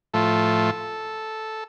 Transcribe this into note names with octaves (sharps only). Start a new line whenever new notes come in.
A2 F3 A3 F4 A4